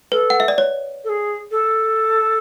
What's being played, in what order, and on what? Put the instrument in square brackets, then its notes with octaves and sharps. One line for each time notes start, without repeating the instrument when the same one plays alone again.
[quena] A4 [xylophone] B4
[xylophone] F#5
E5
D5
C#5
[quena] A4
G#4
A4